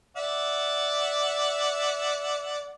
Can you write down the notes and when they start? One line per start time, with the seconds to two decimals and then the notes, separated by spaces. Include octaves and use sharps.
0.17 D5 E5 F#5